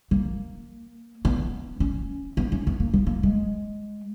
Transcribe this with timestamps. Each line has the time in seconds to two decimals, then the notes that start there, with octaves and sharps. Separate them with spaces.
0.11 A#3
1.25 B3
1.80 C#4
2.37 B3
2.52 C#4
2.67 B3
2.80 A#3
2.94 B3
3.07 A#3
3.23 G#3